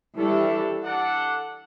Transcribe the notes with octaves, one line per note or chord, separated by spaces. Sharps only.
E3 G3 A3 D4 A4
D4 A4 D5 F#5